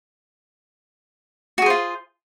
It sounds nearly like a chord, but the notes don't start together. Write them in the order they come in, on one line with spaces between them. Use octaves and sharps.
F#4 G#4 C5 F4